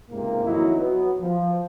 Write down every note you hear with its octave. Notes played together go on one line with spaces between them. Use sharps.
C#2 G#2 C3 A#3
F2 D#3 F#3 D#4 E4
F#3 B3
F3